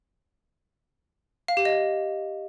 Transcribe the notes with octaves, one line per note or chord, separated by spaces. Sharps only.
F5
G4
D#5